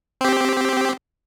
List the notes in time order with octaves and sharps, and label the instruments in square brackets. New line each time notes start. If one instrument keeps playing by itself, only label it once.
[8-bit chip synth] C4 G4